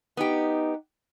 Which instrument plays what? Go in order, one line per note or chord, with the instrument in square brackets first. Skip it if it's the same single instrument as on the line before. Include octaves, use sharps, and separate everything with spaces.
[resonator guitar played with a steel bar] B3 G4 [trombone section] D#4